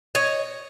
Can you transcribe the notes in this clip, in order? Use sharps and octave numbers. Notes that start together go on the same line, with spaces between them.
C#5 D#5